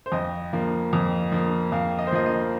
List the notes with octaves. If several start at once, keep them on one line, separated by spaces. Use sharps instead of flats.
C5
F2 D#5
F3 A#3
F2
F3 A#3
F2 F5
D#5
C5
F3 A#3 D#5
D#5